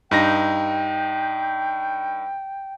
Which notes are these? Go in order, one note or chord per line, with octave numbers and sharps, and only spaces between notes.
G2 D#4 G5 A#6